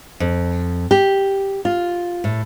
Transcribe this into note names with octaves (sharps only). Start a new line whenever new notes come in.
F2
G4
F4
A2